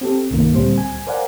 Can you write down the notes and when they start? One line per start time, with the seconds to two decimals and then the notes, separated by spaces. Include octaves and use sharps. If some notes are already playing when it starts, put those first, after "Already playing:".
0.01 C4 G4 A4
0.30 C2 G2 D#3 A#3
0.52 D2 A#2 G3 C4 C5
0.78 G#5
1.07 A#4 C5 D5 F5 F#5 G#5